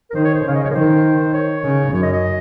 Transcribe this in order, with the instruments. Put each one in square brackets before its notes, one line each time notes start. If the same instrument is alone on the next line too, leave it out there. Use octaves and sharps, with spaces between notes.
[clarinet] A#4
[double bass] D#3 [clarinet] C5
[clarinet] C#5
C5
[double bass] C#3 [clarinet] F5
[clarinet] D#5
C#5
A#4
[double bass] D#3 [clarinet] C5
[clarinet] C#5
[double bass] C#3
[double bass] F#2 [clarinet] C#5
[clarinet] D#5
D#5